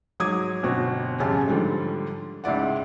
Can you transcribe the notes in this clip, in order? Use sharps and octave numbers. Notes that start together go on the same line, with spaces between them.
G#2 F#3 D6 D#6 G#6
G1 B2 C4 F#4
A1 F#2 C#3 G4 G#5 A5
G#2 D3 F3 G3
C#2 G#2 E4 D5 F#5